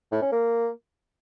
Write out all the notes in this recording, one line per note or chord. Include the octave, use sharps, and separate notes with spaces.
A2
C#4
A#3